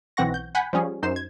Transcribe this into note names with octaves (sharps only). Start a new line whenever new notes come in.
B1 E3 C4 F#5 C#6 A#6
G6
F#5 G#5 B5 G6 B6
F3 G3 C#4 G#4
F#2 D#4 C5 C7 E7
G#6